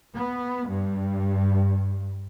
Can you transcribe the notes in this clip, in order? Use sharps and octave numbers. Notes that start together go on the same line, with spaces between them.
B3
G2